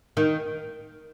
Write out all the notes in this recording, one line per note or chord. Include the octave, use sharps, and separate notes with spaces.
D#3